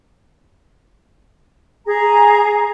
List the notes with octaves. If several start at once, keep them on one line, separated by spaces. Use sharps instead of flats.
G#4 A#5